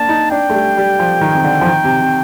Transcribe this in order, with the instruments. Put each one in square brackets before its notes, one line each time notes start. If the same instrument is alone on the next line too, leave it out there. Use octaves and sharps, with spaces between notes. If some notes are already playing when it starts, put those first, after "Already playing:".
Already playing: [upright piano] A#3 D4 [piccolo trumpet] A5
[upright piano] D#4
[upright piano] D4 [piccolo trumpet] G5
[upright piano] A3
G3
G3
F3
D#3
C3
D3
F3
D#3
C3
C3